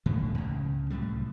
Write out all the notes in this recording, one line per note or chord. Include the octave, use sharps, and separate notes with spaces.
E1 A2 D3 D#3
C#2 C#3
C2 A2 F#3 G3